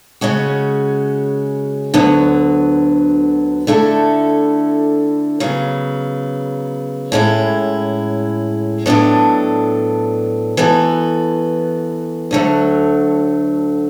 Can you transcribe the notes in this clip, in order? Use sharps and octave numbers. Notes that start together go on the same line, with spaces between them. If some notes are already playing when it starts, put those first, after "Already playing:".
C#3 G#3 C#4 F#4
D2 D3 F#3 B3
D3 A3 E4 A4
C#3 F#3 B3
A2 G#3 C#4 E4
A2 F#3 B3 D4 A4
E3 B3 F#4 A4
D2 D3 F#3 A3